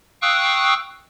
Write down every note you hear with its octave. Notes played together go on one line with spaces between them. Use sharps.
F5 G5 C#6 D#6 E6 F#6